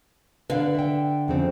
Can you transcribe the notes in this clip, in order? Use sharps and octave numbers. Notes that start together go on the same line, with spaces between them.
D3 B4 F5
E5 G5
F2 C#3 C4